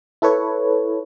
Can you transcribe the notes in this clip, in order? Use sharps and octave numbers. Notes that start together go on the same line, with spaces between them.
E4 A4 B4 C#5